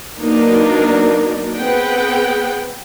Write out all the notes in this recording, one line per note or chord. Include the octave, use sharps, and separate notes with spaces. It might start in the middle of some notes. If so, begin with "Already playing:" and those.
F#3 A#3 B3 D4 D#4
B3 C4 G#4 B4 F#5 G5